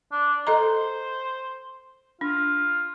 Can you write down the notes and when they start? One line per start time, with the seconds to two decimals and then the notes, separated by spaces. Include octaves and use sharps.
0.12 D4
0.47 A4 C5 D#5 A#5
2.21 D4 F4